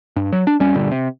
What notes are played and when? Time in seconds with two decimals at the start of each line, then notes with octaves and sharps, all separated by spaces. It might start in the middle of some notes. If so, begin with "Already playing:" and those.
0.16 G2
0.32 F#3
0.47 D4
0.60 F2 G3 C#4
0.75 G1 A#2 D3 G3
0.91 C3